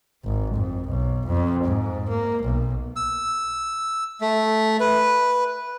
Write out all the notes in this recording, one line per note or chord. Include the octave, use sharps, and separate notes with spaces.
G#1
F2
B1
F2
G#2
A#3
B1
E6
A3
B4